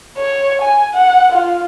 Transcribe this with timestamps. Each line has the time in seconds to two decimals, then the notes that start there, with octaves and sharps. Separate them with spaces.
0.17 C#5
0.62 G#5
0.94 F#5
1.32 F4